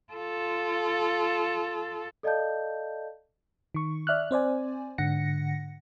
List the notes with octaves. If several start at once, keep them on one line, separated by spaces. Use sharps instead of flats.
F4 A4
A4 D5 D#5 F5 A5 G6
D#3 C#6
D5 E5 F6 F#6
C4 C5 D5 G#5
G#2 D3 F#5 A#6 C#7